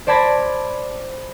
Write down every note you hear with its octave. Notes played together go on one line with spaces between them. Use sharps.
C5 D5 A5 B5 G#6 A#6